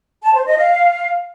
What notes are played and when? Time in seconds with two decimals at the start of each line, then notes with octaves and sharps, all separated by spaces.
0.23 A5
0.35 C5
0.46 D#5
0.58 F5